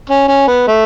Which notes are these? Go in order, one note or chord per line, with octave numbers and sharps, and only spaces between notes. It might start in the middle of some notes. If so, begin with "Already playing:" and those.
C#4
C#4
B3
A3